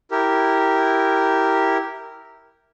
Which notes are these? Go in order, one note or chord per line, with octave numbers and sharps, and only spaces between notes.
E4 G4 A#4